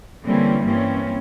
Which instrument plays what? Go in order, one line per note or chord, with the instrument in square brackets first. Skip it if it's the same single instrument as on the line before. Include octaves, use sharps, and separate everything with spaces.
[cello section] D3 E3 G3 A#3 C4 C#4
G2 E3 A#3 C4 C#4